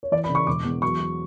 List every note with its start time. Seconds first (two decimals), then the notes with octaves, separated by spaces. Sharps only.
0.03 C#5
0.12 E3 D5
0.24 B5
0.29 C#3
0.35 C#6
0.47 E1 D6
0.65 E2
0.82 F#3 C#6
1.00 F#3